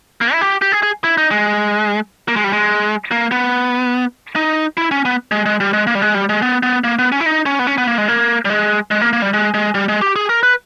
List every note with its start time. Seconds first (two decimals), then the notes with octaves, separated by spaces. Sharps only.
0.21 A#3
0.33 E4
0.41 G4
0.62 G4
0.72 G#4
0.83 G#4
1.04 E4
1.17 D#4
1.31 G#3
2.28 A#3
2.36 G#3
2.44 G3
2.53 G#3
3.11 A#3
3.31 B3
4.36 D#4
4.77 E4
4.91 C#4
5.05 B3
5.32 G#3
5.46 G#3
5.60 G3
5.73 G#3
5.87 A#3
5.95 G3
6.02 G#3
6.14 G3
6.29 G#3
6.42 B3
6.63 B3
6.84 A#3
6.99 B3
7.12 C#4
7.20 E4
7.26 D#4
7.46 C#4
7.59 B3
7.67 C#4
7.78 B3
7.87 A#3
7.98 G#3
8.08 A#3
8.45 G3
8.50 G#3
8.91 G#3
9.01 A#3
9.13 A#3
9.22 G3
9.33 G#3
9.54 G#3
9.75 G3
9.88 G#3
10.01 G4
10.16 G#4
10.29 A#4
10.43 B4